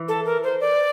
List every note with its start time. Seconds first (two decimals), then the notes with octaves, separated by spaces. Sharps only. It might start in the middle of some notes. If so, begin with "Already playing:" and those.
Already playing: E3
0.08 A4
0.25 A#4
0.43 C5
0.60 D5